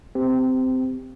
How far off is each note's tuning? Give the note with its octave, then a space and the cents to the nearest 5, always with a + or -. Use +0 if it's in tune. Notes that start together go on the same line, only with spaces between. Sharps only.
C4 -20 G4 +0